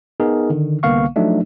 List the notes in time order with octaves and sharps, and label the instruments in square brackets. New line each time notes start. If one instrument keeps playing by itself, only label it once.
[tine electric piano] B3 D#4 G#4 A#4
D3 D#3
C2 D3 A#3 B3 F5 C#6
F3 F#3 A3 D4 D#4